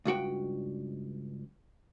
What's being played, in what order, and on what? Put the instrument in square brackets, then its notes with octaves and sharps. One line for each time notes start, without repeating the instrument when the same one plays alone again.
[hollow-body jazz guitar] C#2 G2 F#4 G5